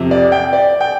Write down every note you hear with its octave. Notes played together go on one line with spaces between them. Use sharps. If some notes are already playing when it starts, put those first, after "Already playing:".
Already playing: F2 C3
D5
G5
D5
G5